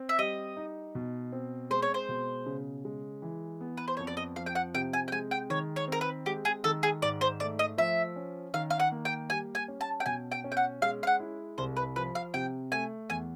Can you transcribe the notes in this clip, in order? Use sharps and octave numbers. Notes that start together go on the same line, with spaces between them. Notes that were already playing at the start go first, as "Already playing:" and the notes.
Already playing: C4
E5
G3 D#5
D#4
B2
C4
G#3 C5
C#5
C5
B2
C#3
G#3
E3
B3
B4
C5
F2 C#5
D5
D#5
F3 F5
G5
F#5
C3 G5
G#5
G5
G#3 G#5
G5
D#3 C#5
C#5
C4 A#4
B4
G#3 G4
G#4
D#3 A4
G#4
G#2 D5
C5
A3 D5
D#5
F3 E5
C#4
D#3 F5
F5
F#5
A#3
G5
G3 G#5
G#5
C#4
A5
G5
B2 G#5
G5
C#4
G5
F#5
G#3 F5
F5
F#5
E4
C2 C5
B4
F3 B4
F5
C3 G5
A3 G#5
E2 G#5